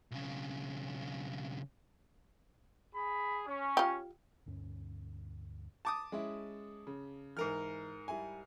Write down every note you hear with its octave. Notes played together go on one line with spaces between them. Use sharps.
B1 C#3
G#4 B5
C#4
F4 G4
D2 G2 C#4
A5 D6 D#6
G#3 C#4 E4
C#3
G#2 E3 A#4 F6
G3 E4 G#5